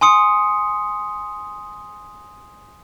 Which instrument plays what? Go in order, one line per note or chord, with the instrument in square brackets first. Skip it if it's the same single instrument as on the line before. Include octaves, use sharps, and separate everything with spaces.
[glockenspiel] G#5 C6 D#6 C#7